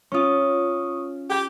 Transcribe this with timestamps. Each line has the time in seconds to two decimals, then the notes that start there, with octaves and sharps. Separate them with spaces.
0.12 C#4 F4 C#6 D#6
1.29 G4